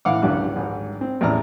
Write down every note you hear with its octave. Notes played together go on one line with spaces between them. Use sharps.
A2 E3 F5 F#5 D6
G#1 C#2 F#2 D3 G3 F#6
G#1
C4
A1 E2 A2 D5 A#5 F6